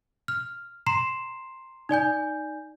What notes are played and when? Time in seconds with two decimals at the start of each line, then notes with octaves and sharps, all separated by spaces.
0.28 F6
0.86 A#5 C6 C7 E7
1.89 D#4 D5 G#5 G6